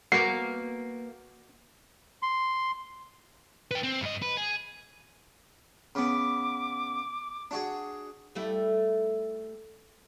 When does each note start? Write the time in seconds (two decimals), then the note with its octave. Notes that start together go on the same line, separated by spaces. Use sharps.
0.12 A#3 B3 F#4 C7
2.22 C6
3.71 B4 G5
3.83 C4
4.01 G2 D#5
4.22 B4
4.37 G#4
5.95 C#3 B3 D6
7.51 D4 F#4 G#4
8.35 G3 A3 E4